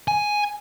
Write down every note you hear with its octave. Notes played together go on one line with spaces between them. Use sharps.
G#5